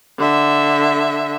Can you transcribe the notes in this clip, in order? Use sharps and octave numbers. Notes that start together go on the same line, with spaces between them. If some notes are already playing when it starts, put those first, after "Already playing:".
D3 E5